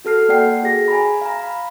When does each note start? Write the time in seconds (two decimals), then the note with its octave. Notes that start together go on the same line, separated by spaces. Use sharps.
0.05 F#4 A4 F6 C7
0.29 A#3 D5 F#5 G5 C7
0.63 F#4 G#4 A#6
0.88 G#5 A#5 B5
1.22 F5 A#5
1.43 B5